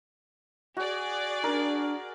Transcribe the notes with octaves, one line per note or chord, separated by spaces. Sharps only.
F#4 G#4 D5
D4 A#4